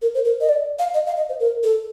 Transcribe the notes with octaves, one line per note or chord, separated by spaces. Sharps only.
A#4
C5
A#4
D#5
D5
F5
D#5
F5
D#5
C5
A#4
A4